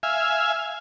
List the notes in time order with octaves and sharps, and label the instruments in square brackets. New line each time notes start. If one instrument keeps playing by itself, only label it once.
[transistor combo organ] E5 F5 G#5